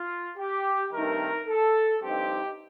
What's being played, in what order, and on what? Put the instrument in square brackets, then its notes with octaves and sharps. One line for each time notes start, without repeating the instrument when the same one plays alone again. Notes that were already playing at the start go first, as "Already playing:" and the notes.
Already playing: [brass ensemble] F4
G4
G2 D#3 A3 C4 D#4 A#4
A4
G2 F3 C4 D#4 G4